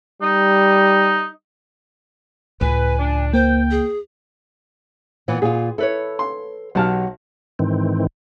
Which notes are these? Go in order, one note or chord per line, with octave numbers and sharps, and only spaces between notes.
G3 D#4
C#2 A2 B4 G#5
D4
A#3 C5 G5
G#4
A#2 E3 B3
A#2 F4 G#4
E4 A4 B4 C#5
C6
B1 F#3 F#4 G4 A5 F6
G#2 D#3 E3 C4